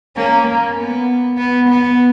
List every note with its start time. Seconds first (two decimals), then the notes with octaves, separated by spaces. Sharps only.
0.16 A#3 C#4
0.46 A#3
0.77 B3
1.38 B3
1.69 B3